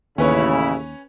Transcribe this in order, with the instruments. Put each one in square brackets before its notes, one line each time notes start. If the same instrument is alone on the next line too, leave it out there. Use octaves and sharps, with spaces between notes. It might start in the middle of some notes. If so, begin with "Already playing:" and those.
[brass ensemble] A1 C#3 E4 [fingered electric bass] D#2 [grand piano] C#4 B4 C#5